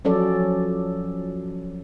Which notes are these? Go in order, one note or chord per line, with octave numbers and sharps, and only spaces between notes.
F3 F#3 C#4 A4 D5